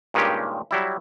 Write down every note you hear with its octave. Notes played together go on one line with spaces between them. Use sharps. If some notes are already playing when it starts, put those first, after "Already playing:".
G2 A#2 D#3 G#3 C#4 G4
F#3 G3 E4